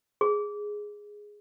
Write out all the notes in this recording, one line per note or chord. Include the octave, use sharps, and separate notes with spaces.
G#4